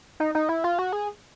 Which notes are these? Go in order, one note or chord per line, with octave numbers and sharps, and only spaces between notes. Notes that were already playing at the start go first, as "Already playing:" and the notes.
D#4
D#4
E4
F4
F#4
G#4